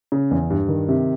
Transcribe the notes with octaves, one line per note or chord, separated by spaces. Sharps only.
C#3
E2
G2
D#3
C3